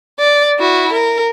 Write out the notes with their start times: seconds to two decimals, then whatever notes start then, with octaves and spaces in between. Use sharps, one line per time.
0.20 D5
0.59 E4 F#4
0.93 A#4